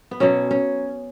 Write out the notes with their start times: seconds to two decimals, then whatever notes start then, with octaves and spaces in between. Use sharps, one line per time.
0.11 B3
0.20 B2 F#3 C#4
0.51 C#4